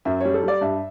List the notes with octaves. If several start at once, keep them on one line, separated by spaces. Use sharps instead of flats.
F#2 E5
G3 C#5
A4
G3 D5
G2 E5